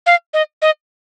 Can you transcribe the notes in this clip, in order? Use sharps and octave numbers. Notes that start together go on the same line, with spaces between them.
F5
D#5
D#5